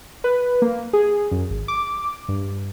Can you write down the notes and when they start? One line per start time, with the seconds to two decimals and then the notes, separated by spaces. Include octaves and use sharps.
0.24 B4
0.62 A#3
0.93 G#4
1.31 F#2
1.50 G#1
1.68 D6
2.28 G2